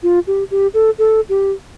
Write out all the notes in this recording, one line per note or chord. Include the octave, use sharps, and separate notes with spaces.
F4
G4
G4
A4
A4
G4